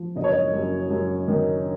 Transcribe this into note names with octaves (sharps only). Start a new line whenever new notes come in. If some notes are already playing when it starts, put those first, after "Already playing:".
Already playing: F3
F#1 D#5
C#5
D#5
F#2
F#2
D#3